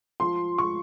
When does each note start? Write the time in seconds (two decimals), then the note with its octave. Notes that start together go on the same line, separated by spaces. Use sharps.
0.20 F3 C6
0.58 C#6